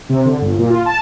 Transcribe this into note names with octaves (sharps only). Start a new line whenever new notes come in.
C3
D3
G1
A#2
F4
A5